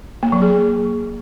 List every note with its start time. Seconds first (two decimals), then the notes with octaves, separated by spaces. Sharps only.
0.23 A#3
0.32 F#3
0.42 G#4